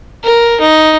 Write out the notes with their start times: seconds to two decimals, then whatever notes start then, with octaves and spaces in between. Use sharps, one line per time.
0.24 A#4
0.60 D#4